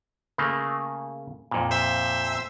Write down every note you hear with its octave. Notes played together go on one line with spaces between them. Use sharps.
C#3 A3 A#3
F2 A#2
C5 E5 E6